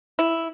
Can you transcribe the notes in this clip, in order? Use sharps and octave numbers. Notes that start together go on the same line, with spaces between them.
E4